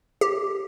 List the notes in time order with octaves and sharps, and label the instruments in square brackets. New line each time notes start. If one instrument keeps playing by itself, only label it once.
[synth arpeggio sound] G4